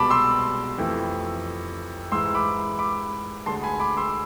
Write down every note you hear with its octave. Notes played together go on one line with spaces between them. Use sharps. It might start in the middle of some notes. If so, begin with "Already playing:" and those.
Already playing: C2 B2 G#3 A5 B5 D6
C6 E6
F2 E3 A3
G#2 E3 G#3 C6 E6
B5 D6
B5 D6
D2 D3 G#3 A5 C6
G#5 B5
B5 D6
C6 E6